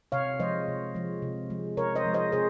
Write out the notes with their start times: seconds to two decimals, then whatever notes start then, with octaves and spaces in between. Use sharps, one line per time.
0.12 C3 C#5 F5
0.40 F3 G#3 C5 D#5
0.68 C3
0.95 F3 G#3
1.22 C3
1.50 F3 G#3
1.77 C3 A#4 C#5
1.95 C5 D#5
2.05 F3 G#3
2.14 C5 D#5
2.32 C3 G#4 C5